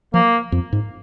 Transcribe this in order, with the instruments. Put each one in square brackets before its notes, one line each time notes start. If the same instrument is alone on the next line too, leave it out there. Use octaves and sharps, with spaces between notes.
[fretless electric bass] F3 [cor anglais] A#3
[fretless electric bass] F2
G#2